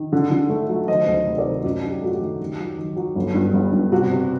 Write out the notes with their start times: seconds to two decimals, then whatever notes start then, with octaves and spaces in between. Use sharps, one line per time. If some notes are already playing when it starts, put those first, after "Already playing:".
Already playing: D#3
0.13 D3
0.32 D3
0.50 A3
0.69 F#3
0.88 D#3 C5 D#5
1.07 D2
1.14 C5 D#5
1.26 C3
1.33 C5
1.38 A#4 D5
1.45 D#3
1.63 F#2 F#4
1.84 D4
1.89 G4
2.01 A3 F#4
2.14 G4
2.21 D#3
2.40 D#3
2.59 F#3
2.78 D#3
2.96 F#3
3.15 G1
3.35 G2
3.53 G1
3.73 G2
3.92 C3 F#4
4.11 C3